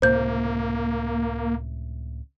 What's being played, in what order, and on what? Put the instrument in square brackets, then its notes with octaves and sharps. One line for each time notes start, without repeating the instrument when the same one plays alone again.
[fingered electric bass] C#2 A2 C3 [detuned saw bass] A#3 [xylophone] C5 G6